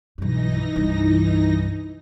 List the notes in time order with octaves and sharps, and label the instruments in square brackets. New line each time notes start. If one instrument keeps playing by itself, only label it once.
[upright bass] B1 G2 [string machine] E3 D#4 A#6
[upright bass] C2 G2